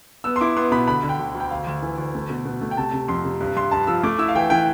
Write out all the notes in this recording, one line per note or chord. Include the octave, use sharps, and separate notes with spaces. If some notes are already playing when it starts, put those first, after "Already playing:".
B3 E6
C6
E4 D6
B3 C6
B2 B5
D3 B5
D3
G5
D2
D2
G5
D2 F5
D2
E3
D2
A3
B2
B2
A3
G5
C3 A5
C3
F2 C6
C3
G2
G2 C6
G2 A5
F3 E6
A3 D6
E4 E6
F5
E3 G5
E3 G5